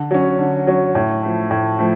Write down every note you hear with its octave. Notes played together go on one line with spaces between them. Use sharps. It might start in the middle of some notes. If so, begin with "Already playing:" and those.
Already playing: D3
F#3 C#4
D3
F#3 C#4
A2
F3 A3
A2
F3 A3